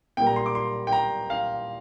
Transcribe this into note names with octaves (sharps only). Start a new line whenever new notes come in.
A#2 G3 A#3 G5
A#5
C6
D6
C6
G5
A#5
F5